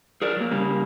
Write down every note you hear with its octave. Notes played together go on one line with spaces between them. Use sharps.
G#4 A#4 D5
F#3 A#3
C#3 G3 A#3